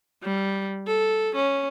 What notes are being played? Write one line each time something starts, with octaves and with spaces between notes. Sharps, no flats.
G3
A4
C#4